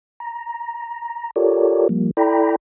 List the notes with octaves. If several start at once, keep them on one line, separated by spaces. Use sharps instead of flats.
A#5
F4 G4 A4 A#4 C#5 D5
F3 G3 A#3
E4 A4 D5 G5 A#5 B5